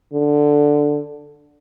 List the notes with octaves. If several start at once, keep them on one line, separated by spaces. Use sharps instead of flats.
D3